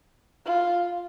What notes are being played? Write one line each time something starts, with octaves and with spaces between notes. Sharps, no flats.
F4